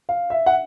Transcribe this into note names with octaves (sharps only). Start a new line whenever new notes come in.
F5
E5
F#5